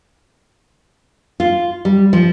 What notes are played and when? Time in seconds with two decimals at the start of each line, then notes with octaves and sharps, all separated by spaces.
1.40 F4
1.85 G3
2.13 F3